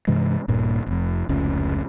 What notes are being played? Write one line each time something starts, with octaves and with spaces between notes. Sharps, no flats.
G2 C3 E3 G#3
D#1 G2 A#2
F1 F2
F1 C#2 C#4